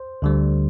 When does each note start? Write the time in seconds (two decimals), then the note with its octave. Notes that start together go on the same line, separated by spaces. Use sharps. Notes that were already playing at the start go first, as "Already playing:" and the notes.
Already playing: C5
0.22 D2 D3 G3